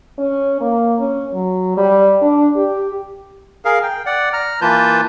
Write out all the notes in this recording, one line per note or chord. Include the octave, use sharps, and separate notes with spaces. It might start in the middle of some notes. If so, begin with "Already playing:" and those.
C#4
A#3
C#4
F#3
G3
D4
G4
G#4 A#4 F5
G5
D5 F#5
A#5 F6
E3 A#3 F4 B4 A5 G6